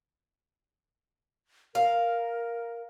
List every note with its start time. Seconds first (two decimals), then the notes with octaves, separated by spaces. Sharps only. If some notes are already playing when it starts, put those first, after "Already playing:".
1.75 A#4 F5